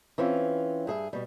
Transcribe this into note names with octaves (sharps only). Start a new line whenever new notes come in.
E3 C4 C#4 F4
G2 G#4 E5
B2 G3